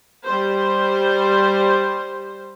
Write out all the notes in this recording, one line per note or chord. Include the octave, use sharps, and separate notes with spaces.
G3 C5